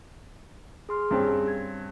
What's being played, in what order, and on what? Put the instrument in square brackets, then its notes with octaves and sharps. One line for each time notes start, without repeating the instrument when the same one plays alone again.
[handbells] G#4 C6 F6
[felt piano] G2 C4 C#4 [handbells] G#4
[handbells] G#6